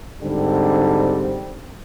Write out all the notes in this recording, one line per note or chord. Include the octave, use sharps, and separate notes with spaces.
G#2 D3 G3 C4